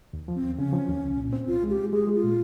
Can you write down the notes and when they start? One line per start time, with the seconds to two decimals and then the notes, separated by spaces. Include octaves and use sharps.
0.13 D#2
0.28 F3
0.36 C4
0.43 D#2
0.57 C#3 C#4
0.73 F3
0.88 D#2
1.03 C2
1.17 A#2
1.33 C4
1.48 C2 F4
1.63 G#3
1.70 G4
1.78 G#3
1.93 G#3 G#4
2.07 G#3
2.15 F4
2.23 A#2